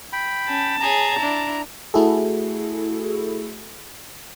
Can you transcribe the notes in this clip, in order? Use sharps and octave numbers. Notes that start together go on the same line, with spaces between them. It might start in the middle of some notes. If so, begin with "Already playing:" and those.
G5 B5
C#4 A5
G#4 C#5 A#5
D4 E4
A3 E4 F#4 G#4 A4